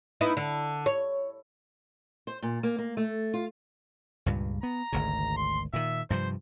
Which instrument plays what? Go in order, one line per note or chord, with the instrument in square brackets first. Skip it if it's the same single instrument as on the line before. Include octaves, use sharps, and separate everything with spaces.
[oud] B3 D#4 E4
D3
C#5
[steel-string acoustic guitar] C5
A#2
A#3
A#3
A3
F4
[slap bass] C#2 G2 A#2
[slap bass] B3 [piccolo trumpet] A#5
[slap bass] G#1 D2 C#3
[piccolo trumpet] C6
[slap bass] A#2 D#3 [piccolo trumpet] E5
[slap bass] G2 C3 F3 [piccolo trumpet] C5